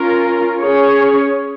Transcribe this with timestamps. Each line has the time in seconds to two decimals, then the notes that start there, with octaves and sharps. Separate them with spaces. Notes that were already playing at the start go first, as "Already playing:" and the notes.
Already playing: C#4 F4 A#4
0.60 C#4 G#4 C#5